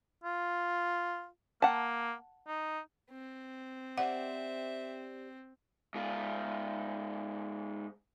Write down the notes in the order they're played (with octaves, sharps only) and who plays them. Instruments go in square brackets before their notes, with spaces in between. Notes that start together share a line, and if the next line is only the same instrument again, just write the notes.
[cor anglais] F4
[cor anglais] A#3 [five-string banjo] F#5 A5
[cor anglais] D#4
[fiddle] C4
[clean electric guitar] G4 C5 D5 [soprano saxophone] E5 [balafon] F#5
[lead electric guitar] G#2 F4